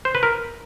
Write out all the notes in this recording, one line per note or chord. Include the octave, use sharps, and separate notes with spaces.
C5
B4
A#4